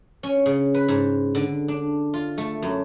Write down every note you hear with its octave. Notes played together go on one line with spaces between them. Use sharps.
C#4
C#3
B4
G#2
D3
D4
F4
A3
F#2